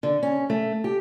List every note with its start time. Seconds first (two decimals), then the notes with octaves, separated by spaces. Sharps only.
0.03 D3
0.23 C#4
0.50 A3
0.84 G4